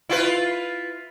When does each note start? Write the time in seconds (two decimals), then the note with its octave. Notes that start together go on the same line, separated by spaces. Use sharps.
0.09 E4 F4 B4